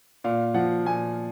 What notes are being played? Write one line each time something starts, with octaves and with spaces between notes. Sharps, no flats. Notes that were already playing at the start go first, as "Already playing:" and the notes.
A#2 F5
F3 F#5
A#2 G#5